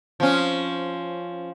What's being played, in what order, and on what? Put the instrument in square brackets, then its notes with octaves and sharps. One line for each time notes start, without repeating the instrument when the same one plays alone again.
[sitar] F3 C#4